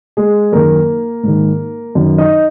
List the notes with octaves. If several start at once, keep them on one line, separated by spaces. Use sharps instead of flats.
G#3 G#4
F#2 D#3 A#3 A#4
G#2 D#3
F#2 D#3
D#4 D#5